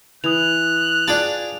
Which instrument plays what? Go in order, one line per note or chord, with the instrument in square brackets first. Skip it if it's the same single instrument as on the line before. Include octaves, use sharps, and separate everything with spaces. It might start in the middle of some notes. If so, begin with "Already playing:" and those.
[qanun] E3 [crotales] D#6 F7 [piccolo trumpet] F#6
[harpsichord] D4 G5 A5 [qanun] F4 G#4